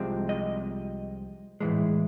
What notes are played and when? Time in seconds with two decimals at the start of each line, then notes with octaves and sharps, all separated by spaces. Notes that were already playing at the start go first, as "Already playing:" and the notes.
Already playing: C2 C3 F3 G#3 C4
0.29 D#5
1.60 A2 E3 G#3